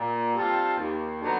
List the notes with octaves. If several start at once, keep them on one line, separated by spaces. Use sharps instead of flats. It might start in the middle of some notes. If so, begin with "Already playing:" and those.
Already playing: A#2
G3 C4 F4 A4
D#2
D3 F#3 B3 D#4